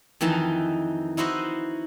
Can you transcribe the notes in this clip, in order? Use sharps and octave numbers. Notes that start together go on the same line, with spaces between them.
F2 D#3 E3 D#4 A5
D#4 E4 F#4 C5 D#5